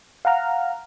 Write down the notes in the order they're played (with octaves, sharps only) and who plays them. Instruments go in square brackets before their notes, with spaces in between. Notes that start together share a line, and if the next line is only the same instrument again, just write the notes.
[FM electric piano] F5 F#5 A#5 F6